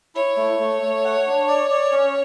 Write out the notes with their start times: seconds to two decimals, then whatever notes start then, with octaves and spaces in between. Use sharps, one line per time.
0.15 E4 C#5
0.37 A3
0.59 A3
0.82 A3
1.04 F#5
1.27 D4
1.48 D5
1.70 D5
1.92 C#4